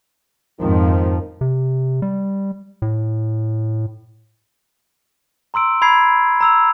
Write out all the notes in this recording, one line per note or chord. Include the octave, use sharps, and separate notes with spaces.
F2 G#2 D#3 F3
C3
G3
A2
A#5 C6 E6 D7
A#5 B5 G#6 C7
A#5 E6 F7